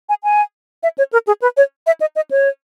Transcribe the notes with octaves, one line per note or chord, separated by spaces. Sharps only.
G#5
G#5
E5
C#5
A#4
G#4
B4
C#5
E5
D#5
D#5
C#5